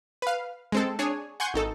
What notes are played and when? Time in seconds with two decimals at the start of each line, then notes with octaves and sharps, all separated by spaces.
0.22 B4 F5
0.72 G#3 C4 A4
0.99 D4 G#4 C#5 G#5
1.40 F#5 G#5 C6 C#6 G6
1.54 G#1 D#4 A4